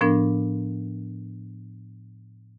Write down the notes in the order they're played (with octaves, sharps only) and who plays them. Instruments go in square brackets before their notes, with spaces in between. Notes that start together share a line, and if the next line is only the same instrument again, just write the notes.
[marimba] A2 F3 B3 D4 A#4